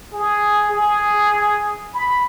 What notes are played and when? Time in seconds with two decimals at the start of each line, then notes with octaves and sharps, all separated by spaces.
0.14 G#4
0.71 G#4
1.94 B5